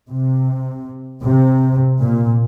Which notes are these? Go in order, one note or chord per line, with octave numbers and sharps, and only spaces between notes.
C3
C3
A#2